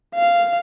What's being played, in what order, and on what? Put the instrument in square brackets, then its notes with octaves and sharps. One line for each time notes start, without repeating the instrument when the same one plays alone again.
[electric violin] F5